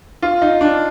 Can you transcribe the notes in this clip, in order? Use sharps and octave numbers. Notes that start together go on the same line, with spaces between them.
F4
D#4
D4